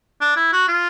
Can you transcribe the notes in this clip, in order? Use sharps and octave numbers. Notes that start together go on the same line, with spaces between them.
D4
E4
F#4
F4